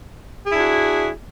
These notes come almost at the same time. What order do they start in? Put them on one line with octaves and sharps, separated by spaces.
G#4 E4 D4 F#4